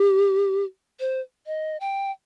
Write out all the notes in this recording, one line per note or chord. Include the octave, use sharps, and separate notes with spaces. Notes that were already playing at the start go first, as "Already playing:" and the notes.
Already playing: G4
C5
D#5
G5